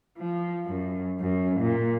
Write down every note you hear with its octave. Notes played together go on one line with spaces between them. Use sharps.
F3
F#2
F#2
A#2